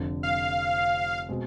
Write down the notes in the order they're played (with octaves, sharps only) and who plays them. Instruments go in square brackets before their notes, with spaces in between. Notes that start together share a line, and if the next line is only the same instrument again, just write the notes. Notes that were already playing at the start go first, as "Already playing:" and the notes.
Already playing: [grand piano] F1 F2 D3
[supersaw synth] F5
[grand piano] B2 G#3 C4